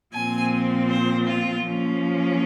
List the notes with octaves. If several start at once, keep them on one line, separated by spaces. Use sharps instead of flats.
A#2 F3 C4 G#5
C5
F4
F3 A#3 C#4